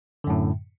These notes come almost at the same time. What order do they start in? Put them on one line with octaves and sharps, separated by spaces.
D3 F#2 A2